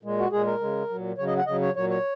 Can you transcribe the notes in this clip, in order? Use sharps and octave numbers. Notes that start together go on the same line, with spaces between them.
A#2 G#3
F#4
A#2 G#3 G#4
A#4
C#3 G#3
A#2 F#3
C#3 F#3 C#5
D#5
F#5
C#3 F#3 D#5
C#5
A#2 F#3 C#5
C#5